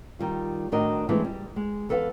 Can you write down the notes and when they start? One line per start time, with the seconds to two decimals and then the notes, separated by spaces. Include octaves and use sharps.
0.19 D#3 G3 F4
0.72 A2 D#3 D4 F#4 A#4 D#5
1.09 E3 G#3 A3 B3 C4 D4
1.25 G3
1.56 G#3
1.89 E2 A4 B4 D#5 F5 F#5